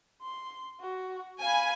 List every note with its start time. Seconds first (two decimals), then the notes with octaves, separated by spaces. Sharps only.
0.22 C6
0.80 F#4
1.42 F5 G#5 B5